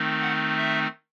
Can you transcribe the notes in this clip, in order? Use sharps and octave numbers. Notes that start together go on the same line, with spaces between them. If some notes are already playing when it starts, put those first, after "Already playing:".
Already playing: D#3 A3 C4 D#4
F#5
E5